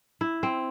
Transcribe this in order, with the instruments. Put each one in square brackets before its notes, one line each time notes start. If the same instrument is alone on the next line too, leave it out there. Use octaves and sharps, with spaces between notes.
[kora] E4
C4